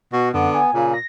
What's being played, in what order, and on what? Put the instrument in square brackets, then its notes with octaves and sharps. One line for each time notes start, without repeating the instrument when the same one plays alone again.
[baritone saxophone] B2 [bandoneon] F#4
[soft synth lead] F#2 [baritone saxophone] D3 [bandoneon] B3
[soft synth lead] G#5
[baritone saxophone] A#2 [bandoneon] C#3
[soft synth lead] A#6